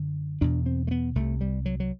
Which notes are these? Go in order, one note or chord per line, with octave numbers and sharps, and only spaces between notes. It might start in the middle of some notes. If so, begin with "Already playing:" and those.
Already playing: F#2 D3
E2 B2 D4
C4
A3
B3
C2 C3 A3
G3
F#3
F#3